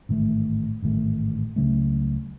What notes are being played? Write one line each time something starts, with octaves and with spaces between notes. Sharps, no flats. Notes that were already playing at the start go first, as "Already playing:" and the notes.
A1 G#2 D#3 A3
A1 G#2 D#3 A3
C#2 C#3 F#3 A3